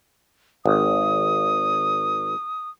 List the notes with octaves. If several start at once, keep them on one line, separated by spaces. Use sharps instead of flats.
G#1 D#6